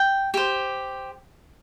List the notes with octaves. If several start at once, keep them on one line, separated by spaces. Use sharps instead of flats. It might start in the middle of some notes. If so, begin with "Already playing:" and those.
Already playing: G5
G4 C5